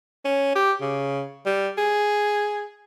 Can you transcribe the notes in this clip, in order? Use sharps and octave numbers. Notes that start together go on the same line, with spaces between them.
C#4
G4
C#3
G3
G#4